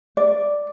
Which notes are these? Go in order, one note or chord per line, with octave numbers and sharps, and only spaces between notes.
D5